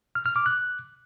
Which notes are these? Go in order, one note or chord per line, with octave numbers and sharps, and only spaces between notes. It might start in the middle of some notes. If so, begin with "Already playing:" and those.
F6
F6
D6
F#6